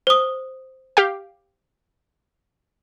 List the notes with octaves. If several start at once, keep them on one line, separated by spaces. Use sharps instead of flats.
C5 D#6
G4 F5 G5